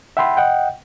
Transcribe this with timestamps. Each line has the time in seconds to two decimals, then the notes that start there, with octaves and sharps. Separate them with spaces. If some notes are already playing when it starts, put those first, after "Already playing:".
0.17 E5 F#5 G5 B5 C6
0.37 D#5 F#5 G5